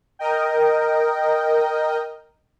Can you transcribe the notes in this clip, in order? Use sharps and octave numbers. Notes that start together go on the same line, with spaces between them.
A#4 D#5 G5